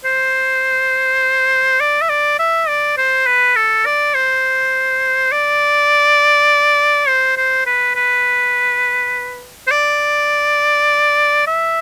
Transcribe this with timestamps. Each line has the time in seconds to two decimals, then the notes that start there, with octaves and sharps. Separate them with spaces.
0.05 C5
1.80 D5
2.02 E5
2.09 D5
2.39 E5
2.68 D5
2.98 C5
3.27 B4
3.56 A4
3.85 D5
4.15 C5
5.32 D5
7.08 C5
7.37 C5
7.66 B4
7.96 B4
9.67 C5
9.71 D5
11.47 E5